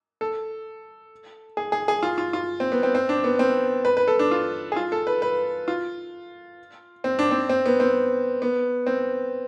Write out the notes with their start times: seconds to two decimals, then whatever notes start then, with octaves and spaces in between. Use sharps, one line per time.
0.21 A4
1.57 G#4
1.72 G#4
1.88 G#4
2.03 F4
2.18 F4
2.33 F4
2.60 C4
2.72 B3
2.83 C4
2.95 C4
3.09 D4
3.24 B3
3.39 C4
3.85 B4
3.97 B4
4.08 A4
4.19 D4
4.31 F4
4.72 G#4
4.76 F4
4.92 A4
5.07 B4
5.22 B4
5.68 F4
7.04 C4
7.19 D4
7.31 C4
7.49 C4
7.66 B3
7.80 C4
8.42 B3
8.86 C4